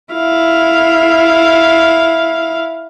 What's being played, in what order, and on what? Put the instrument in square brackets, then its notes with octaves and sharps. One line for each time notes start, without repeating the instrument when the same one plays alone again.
[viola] E4 F5